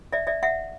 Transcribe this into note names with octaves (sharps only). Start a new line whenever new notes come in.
D5 E5
D5 E5
E5 F#5